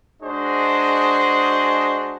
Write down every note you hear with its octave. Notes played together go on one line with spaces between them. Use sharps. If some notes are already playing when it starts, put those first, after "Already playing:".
G#3 D4 F#4 G#4 C5 D#5